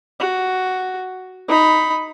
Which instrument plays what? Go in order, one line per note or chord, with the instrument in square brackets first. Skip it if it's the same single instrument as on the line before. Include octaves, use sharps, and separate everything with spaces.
[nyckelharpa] F#4
D#4 B5